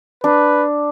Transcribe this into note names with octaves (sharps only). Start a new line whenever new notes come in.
D4 B4